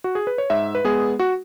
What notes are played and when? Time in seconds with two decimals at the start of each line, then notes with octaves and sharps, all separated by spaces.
0.04 F#4
0.15 G#4
0.27 B4
0.38 C#5
0.50 G#2 E5
0.75 B4
0.85 G#3 B3 G#4
1.19 F#4